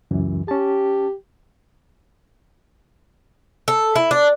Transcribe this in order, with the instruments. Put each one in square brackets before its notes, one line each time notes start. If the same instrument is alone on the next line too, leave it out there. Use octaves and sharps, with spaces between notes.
[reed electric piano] C#2 F#2 E3
[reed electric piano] C#4 A5 [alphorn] G4
[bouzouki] A4
E4
D4